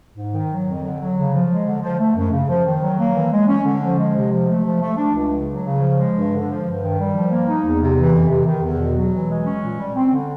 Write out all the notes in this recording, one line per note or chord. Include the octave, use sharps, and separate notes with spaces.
G#2
D#3
F#3
F2
D3
F#3
C#3
F3
G#3
D3
F3
A3
F#2
C#3
F3
D#3
F#3
A#3
E3
G#3
C#4
D3
F3
G#3
C3
F3
A3
F3
A3
D4
C#2
C#3
F#3
C#3
F3
G#3
G2
D3
F3
G2
D#3
G3
F3
A#3
D#4
E2
C3
E3
F2
C3
D#3
E2
B2
F#3
E3
G#3
C#4
A#2
G3
C4
D3